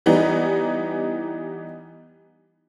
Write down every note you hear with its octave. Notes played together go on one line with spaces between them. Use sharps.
E3 G3 B3 D#4